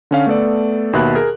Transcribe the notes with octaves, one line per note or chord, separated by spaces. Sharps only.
D3 C#4 F5
A3 B3 A4 D5
D#2 B2 E5 B5 F#6
G#4 A#4